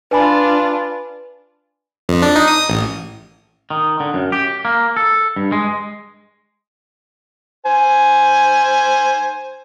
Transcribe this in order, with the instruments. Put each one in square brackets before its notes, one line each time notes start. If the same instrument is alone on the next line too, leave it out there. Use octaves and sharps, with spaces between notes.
[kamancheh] D4 F4 [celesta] B4 G#5 B5
[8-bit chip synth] F2
D4
D#4
D#6
A1
[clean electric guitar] D#3
D3
F#2
G4
A#3
A4
G2
G#3
[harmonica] C5 G#5